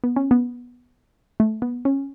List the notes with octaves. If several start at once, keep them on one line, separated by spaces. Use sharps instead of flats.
B3
C#4
B3
A3
B3
C#4